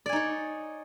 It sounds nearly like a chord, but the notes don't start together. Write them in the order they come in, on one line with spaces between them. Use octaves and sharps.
D5 G#5 D#4 C#5